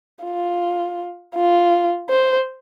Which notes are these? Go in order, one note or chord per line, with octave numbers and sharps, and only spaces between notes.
F4
F4
C5